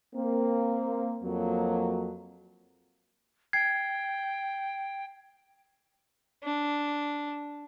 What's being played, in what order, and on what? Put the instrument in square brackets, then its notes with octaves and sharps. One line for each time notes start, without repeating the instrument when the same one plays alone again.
[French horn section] A#3 C4
F2 F#3 A#3
[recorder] G5 [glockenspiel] G#6 C7
[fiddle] D4